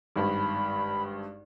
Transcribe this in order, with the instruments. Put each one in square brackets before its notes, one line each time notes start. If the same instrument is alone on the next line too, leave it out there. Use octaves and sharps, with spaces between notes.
[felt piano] G#1 G2 [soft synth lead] B5